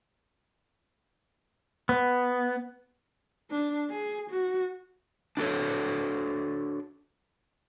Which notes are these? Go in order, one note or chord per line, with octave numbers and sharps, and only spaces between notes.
B3
D4
G#4
F#4
D4 F#4 A4 C#5